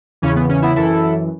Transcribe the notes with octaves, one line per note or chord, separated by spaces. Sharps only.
E2 C#3 E3 C#4
B3
C#4
B3 E4
F#2 E3 E4 A4